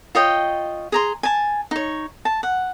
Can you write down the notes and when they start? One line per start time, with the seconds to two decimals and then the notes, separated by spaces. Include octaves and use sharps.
0.15 F4 C#5 D#5 G5
0.92 G#4 A#5 C6
1.23 G#5 A5
1.71 D#4 C#5
2.25 A5
2.43 F#5